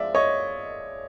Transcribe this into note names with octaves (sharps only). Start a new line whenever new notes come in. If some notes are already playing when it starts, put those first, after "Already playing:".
Already playing: F3 G#3 D5 E5
C#5 D#5